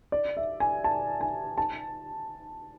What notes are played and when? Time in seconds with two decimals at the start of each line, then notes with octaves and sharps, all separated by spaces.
0.12 D5
0.37 E5
0.60 G#5
0.84 A5
1.21 G#5
1.58 A5